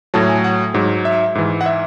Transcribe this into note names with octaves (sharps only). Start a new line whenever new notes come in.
A2 F#3 A5
G#5
F#5
G#2 F#3
E5
G#2 E3
F#5
E5